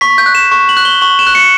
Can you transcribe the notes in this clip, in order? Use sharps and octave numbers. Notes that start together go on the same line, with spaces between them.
C#6 B6
G6
F#6
E7
C#6
F#7
F#6
G7
C#6 F#7
E7
F#6
C#7